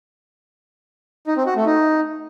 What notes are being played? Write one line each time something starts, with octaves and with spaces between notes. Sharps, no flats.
D#4
C4
F#4
A3
D#4